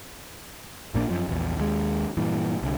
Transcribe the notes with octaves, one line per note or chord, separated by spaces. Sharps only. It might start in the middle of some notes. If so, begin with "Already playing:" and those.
A#1 A#2 A#3 D4
F#2 F3
A#1 E2
D#2 G#3
G2 A#2 E3
C2 D3